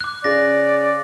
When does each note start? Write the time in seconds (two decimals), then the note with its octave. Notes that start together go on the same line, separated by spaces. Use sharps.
0.01 D6 F#6
0.24 C#3 D5 A#6